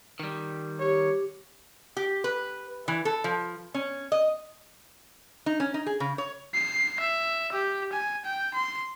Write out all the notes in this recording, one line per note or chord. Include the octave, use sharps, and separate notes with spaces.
D#3 G3
G4 C#5
G4
B4
E3
A4
F3
C#4
D#5
D#4
C#4
D#4
G#4
C#3
C#5
C7
E5
G4
G#5
G5
C6